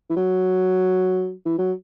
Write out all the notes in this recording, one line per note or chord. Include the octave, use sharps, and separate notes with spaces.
E3
F#3
E3
F#3